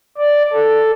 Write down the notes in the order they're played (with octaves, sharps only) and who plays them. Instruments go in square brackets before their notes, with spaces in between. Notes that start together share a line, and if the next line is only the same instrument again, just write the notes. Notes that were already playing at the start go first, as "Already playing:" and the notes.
[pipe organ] D5
A4